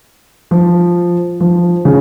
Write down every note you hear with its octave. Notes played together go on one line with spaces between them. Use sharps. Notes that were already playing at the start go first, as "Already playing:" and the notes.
F3
F3
C#3